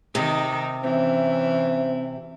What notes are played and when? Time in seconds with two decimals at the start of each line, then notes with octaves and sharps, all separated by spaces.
0.15 C3 D#3 D#4
0.84 E3 C4 C#4 E5